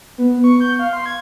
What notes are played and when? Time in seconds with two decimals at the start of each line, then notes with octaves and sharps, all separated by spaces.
0.18 B3
0.44 C#6
0.60 G6
0.79 F5
0.93 C6
1.06 G#6